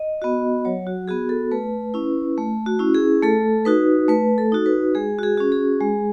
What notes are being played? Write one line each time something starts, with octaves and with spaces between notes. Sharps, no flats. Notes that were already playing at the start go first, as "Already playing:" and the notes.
Already playing: D#5
B3 F#4
F#3 C#5
F#4
B3 F#4 G#4
A4
A3 B4
C#4 E4
A3
F#4
C#4 E4
G#4
A3 A4
D#4 F#4 B4
A3 B4
A4
D#4 F#4
B4
G#3 G#4
F#4
G#4
C#4 F#4
G#4
G#3